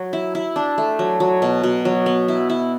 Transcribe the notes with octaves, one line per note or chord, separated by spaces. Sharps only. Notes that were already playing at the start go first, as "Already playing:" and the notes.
Already playing: F#3
E4
E4
D4
A3
F#3
F#3
B2
B2
F#3
B3
E4
E4